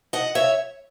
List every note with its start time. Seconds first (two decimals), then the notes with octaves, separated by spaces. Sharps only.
0.13 D#5 F#5
0.35 C#5 E5